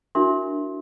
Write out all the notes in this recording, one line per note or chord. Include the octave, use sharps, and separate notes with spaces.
D4 E4 F#4 A#4 E5 C6